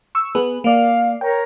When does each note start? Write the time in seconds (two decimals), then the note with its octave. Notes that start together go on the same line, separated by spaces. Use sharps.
0.15 C#6 E6
0.35 B3 G#4 B4
0.64 A#3 D5 F5
1.21 A#4 C#5 G5